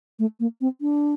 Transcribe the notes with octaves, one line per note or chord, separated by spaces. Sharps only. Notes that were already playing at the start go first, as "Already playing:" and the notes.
A3
A#3
C4
D4